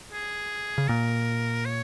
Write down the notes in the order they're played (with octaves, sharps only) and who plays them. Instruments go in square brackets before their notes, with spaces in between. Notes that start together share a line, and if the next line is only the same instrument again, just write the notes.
[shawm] G#4
[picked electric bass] C#3
[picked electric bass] A#2 [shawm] A#4
[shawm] C#5